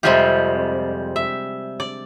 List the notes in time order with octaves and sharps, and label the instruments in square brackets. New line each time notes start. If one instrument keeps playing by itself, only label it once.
[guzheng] F2 C3 G3 G#3 F4 G4
E5
D5